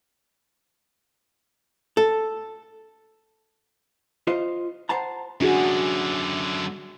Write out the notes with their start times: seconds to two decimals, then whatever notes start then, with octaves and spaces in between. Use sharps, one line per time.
1.97 A4
4.27 F4 C5 D#5
4.89 C5 F#5 A5 A#5
5.41 F#2 D3 D4 F#4 G#4